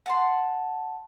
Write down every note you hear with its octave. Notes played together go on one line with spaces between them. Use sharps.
F#5 A5 C6